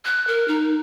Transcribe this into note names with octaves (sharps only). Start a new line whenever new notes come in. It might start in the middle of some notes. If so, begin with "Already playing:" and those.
F#6
A#4
D#4